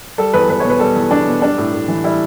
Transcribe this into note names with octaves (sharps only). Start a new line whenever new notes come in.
G3 A4
E2 B4
E2 B4
C#5
B2
B4
G3 A4
E2
E2 D4
B2
G3 D4
A2
A2
E3
G3 E4